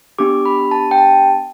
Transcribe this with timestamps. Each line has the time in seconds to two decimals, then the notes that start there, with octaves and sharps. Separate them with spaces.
0.19 B3 D4 G4 D6
0.45 B5
0.71 A5
0.91 G5
0.98 A5